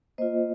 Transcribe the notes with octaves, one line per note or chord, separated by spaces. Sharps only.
A#3 F4 C5 D#5